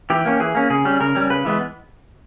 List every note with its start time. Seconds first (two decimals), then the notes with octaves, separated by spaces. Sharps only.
0.10 E3 G4
0.25 A#3 C#4
0.40 E3 G#4
0.55 A#3 C#4
0.70 C#3 G#4
0.85 G3 C#4
1.00 C#3 A#4
1.15 G3 C#4
1.30 C#3 B4
1.45 E3 G#3 B3